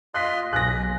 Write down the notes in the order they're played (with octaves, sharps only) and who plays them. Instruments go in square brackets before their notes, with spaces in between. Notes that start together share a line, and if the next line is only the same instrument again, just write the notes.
[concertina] F4 D#5 C6 [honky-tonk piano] F#6 B6
[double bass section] B1 [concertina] G#4 [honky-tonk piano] F#6 A#6